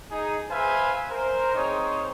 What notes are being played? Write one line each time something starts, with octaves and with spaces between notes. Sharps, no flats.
D#4 G#4
G#4 B4 C5 E5 F5 G#5
A#4 C5
C4 D#4 G#4 C5 C#5